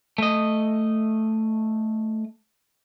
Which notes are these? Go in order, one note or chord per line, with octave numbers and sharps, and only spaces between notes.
A3 D#5